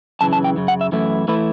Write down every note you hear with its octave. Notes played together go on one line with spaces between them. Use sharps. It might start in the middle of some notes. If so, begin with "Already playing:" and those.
F#2 C#3 E3 A5
A5
G5
F#2 C#3
F#5
E5
F#2 E3 A3 E4
E3 A3 E4 B4